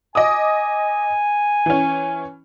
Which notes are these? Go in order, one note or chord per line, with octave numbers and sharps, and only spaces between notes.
D#5 G#5 D6 D#6
E3 C#4